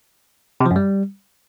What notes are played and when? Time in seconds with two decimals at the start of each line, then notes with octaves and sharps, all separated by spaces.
0.60 C3
0.66 F3
0.71 F#2
0.76 G3